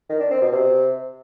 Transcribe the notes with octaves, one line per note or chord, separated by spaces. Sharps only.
D#3
D4
C4
B2
C3